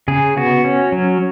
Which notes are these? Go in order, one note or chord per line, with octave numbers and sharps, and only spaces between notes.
C#3 G#4
B3 F#4
C#4
F#3